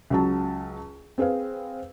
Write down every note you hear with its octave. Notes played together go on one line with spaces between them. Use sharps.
C#2 F#3 A5
C4 G#4 B4 F5